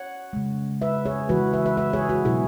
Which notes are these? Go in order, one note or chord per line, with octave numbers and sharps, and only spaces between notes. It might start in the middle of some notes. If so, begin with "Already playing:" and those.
Already playing: C#5 F#5
C#3 G#3
B4 E5
G#4 C#5
C#3 E3 G#3 F#4 B4
B4 E5
B4 E5
B4 E5
G#4 C#5
F#4 B4
B2 F#3 E4 G#4